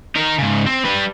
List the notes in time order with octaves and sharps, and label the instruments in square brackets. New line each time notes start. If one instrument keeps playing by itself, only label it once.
[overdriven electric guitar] D#4 A#4
G#2 C#3
C4
G3 B4